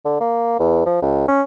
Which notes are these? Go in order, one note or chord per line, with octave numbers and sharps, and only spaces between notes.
D3
A#3
E2
F3
C#2
C#4